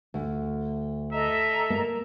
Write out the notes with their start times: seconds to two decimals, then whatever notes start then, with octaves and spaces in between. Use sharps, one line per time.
0.14 D2
1.12 A4 D#5 E5 A#5
1.70 A#3